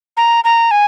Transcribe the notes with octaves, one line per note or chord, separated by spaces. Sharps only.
A#5
A#5
G#5